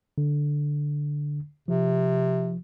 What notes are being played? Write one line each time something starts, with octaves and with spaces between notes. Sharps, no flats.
D3
C3 F3